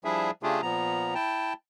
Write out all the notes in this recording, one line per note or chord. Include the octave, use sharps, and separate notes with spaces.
F3 G3 D4 E4 G#4 E5
C#3 A3 D4 F4 G4 G#4
A#2 F3 B3 A#5
E4 G5 A5